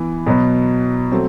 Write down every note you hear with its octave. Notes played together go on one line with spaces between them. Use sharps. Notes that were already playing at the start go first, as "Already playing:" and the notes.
Already playing: E3 B3
B2 F#3 B3
F#3 A3 C4